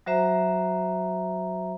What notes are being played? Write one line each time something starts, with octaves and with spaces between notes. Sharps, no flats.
F#3 F#4 C5 E5 A#5